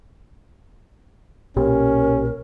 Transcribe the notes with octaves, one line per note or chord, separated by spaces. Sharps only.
B1 A#2 C#4 G4 A#4